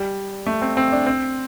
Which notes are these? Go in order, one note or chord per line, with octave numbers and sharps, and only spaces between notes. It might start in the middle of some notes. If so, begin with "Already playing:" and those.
Already playing: G3
A3
C4
C4
D4
C4